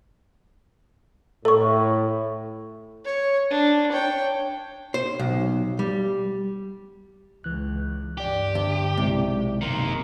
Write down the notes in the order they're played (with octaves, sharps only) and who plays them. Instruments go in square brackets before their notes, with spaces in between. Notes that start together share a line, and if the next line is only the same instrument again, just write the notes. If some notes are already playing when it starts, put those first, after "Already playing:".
[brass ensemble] A2 [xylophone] A4 C#6
[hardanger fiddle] C#5
D4
C#5 G5
[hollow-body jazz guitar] C5
B1
G3
[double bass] C#2 [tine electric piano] E3 F#6
[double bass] G2 [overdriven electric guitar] G4 [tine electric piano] D5 D6
[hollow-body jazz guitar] D2
[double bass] B1 [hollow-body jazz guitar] C3 [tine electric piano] G#3 E4 D5
[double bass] F#1 B1 [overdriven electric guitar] D#3 A#3 [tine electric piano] A#5 C6